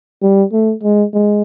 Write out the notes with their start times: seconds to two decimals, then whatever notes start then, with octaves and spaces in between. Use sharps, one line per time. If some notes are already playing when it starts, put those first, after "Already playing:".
0.22 G3
0.53 A3
0.83 G#3
1.14 G#3